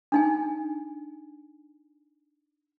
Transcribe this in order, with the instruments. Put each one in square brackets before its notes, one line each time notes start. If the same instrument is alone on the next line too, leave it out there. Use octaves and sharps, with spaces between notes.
[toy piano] D4 D#4 G#5